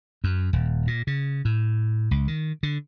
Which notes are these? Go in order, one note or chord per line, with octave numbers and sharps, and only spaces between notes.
F#2
D#1
A#2
C#3
A2
C#2
D#3
D3